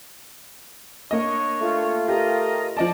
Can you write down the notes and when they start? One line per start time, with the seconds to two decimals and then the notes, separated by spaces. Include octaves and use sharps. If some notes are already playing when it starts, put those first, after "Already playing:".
1.11 A#3 D4 C#5 D#5 C#6
1.62 A3 F4
2.08 G4 A#4 D#5 A#5
2.77 F3 D5 D#5 A5